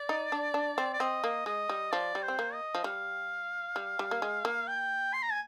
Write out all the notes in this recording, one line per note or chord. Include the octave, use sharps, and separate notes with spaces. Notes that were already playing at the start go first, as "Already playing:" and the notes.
Already playing: D5
D#4
D4
D4
C4
D5
C4 D#5
A#3
G#3 D#5
G3
F3 D5
G3
C5
C4
A#3
D#5
F3
G3 F5
G3
G3
A#3
G#3
A#3
G5
C6
A#5
G#5